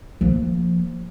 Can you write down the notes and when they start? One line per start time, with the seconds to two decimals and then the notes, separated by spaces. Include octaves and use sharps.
0.21 F3 A#3